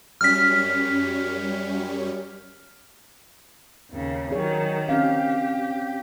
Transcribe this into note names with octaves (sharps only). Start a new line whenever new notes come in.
F#2 G3 C#4 F6 B6
D#2 C#3
D#3 F#3 G#4 C#5
C4 C#4 G4 F5